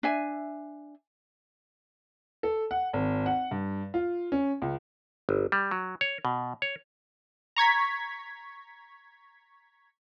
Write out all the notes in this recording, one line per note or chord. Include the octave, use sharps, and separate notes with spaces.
D4 E5 G#5
A4
F#5
G#1
F#5
G2
F4
C#4
C#2
G1
G3
F#3
C#5
B2
C#5
A#5 C#6 G#6 B6